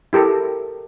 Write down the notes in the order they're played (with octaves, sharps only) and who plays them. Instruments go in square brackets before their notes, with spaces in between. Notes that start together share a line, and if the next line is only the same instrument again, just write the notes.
[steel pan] E4 G4 A4 A#4